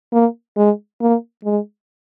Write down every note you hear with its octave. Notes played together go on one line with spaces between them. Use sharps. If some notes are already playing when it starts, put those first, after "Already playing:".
A#3
G#3
A#3
G#3